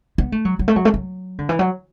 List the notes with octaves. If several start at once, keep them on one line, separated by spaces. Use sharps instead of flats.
B3
A3
F#3
F#3
A3
F#3
A3
F#3
D3
E3
F#3